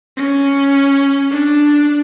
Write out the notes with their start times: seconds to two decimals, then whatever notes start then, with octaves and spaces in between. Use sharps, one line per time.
0.17 C#4
1.31 D4